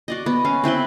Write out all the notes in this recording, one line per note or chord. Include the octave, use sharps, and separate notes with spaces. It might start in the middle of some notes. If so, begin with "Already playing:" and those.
F#4 D5 D#5
B3
C#4 F5
C4 E4 B4 C6